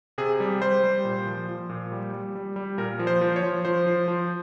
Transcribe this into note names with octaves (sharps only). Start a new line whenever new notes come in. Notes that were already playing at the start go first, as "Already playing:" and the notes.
C3 G#4
G3
G3 C5
G3
A#2
F3
F3
A#2
G3
G3
G3
G3
A#2 A#4
F3
C5
F3
C#5
F3
F3 C5
F3
F3